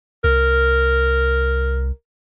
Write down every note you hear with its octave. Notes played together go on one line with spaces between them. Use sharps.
C2 A#4